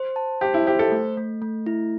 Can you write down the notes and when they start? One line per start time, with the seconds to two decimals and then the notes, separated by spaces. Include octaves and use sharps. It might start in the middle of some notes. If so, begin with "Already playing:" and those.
Already playing: C5
0.16 A5
0.41 G4 C5
0.54 E4
0.67 G4 C5
0.79 A4
0.92 A3
1.17 A3
1.42 A3
1.66 E4